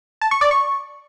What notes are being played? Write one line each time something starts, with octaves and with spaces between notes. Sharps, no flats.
A5
C#6
D5
C#6